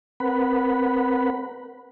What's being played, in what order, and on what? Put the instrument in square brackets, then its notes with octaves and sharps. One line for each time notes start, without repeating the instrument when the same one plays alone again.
[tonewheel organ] C4 A#4 B4 F#5 B5